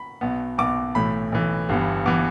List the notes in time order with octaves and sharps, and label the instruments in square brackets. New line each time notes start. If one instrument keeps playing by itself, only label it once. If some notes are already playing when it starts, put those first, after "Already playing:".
Already playing: [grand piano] B5
B1 B2 B3
B1 B2 B3 D6
B1 A2 E3 A3 B5
B1 A2 E3 A3
G1 G2 E3 B3
E3 B3 D6